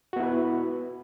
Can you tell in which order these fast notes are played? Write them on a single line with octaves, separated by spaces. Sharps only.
F#4 B3 E4 B4